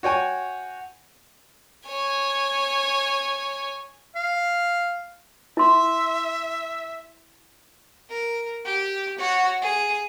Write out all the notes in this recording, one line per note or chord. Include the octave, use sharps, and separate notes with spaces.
F#4 C#5 G5 G#5
C#5 G#5
F5
E4 E5 C6
A#4
G4
F#4 C#5
G#4